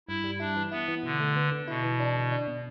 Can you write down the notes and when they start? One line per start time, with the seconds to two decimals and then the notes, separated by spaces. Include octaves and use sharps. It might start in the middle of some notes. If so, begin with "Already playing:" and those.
0.08 G2 E4
0.24 G3
0.40 D4 E4
0.56 E3
0.72 B3 E4
0.88 E3
1.03 B2 D3
1.20 A3
1.36 B3
1.52 D3
1.68 B2 E4
1.84 E3
2.00 D4
2.16 D3
2.32 D4
2.48 B2